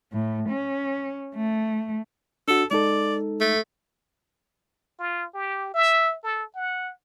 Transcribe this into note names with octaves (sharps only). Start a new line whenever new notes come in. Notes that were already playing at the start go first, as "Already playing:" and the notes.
A2
C#4
A3
D4 F#4 A4
G#3 D#4 A4 D5
A3
F4
G4
E5
A4
F#5